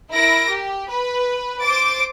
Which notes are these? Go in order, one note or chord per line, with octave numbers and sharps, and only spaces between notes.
E4 A#4 A#6 D7
G4
B4
C5 D6 A6 D7